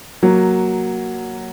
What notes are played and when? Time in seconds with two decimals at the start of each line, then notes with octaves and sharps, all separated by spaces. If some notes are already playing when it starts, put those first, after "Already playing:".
0.22 F#3 A#3